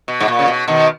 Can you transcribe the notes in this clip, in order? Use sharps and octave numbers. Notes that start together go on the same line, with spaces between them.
B2
G#2
A#2
C#3
B2
B2 D#3